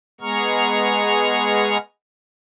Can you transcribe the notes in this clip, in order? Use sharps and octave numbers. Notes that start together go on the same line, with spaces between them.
G#3 B3 G#4 A#5 C#6 F6